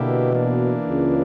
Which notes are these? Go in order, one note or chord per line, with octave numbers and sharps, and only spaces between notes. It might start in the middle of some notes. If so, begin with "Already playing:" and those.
Already playing: B2 D3 A#3 E4 G4
E3 A#3 D4
C#2 C#3